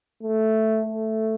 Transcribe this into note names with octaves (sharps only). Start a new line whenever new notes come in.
A3
A3